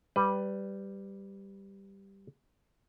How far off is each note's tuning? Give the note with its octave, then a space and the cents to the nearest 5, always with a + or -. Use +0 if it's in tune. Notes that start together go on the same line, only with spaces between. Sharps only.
G3 +0 B4 +20